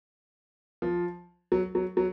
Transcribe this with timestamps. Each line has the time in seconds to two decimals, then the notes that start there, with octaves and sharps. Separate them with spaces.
0.82 F3
1.52 F#3
1.75 F#3
1.97 F#3